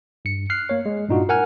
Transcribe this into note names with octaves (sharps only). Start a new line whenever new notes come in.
G2 C#7
F6 F#6 C7
A#3 C#5
G#3
G2 A#2 D4 D#4 F4 F#4
A#4 F#5 G#5 F6